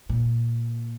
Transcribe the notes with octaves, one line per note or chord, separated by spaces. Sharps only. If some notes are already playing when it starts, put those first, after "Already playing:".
A#2